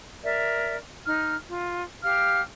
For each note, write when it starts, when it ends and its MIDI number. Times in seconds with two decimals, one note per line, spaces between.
0.24 0.76 70
0.24 0.76 74
0.24 0.76 76
1.06 1.35 63
1.06 1.35 89
1.48 1.83 65
2.03 2.41 67
2.03 2.41 77
2.03 2.41 89